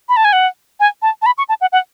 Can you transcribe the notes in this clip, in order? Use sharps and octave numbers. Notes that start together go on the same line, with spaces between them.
B5
A5
G#5
F#5
G#5
A5
A5
B5
C#6
A5
F#5
F#5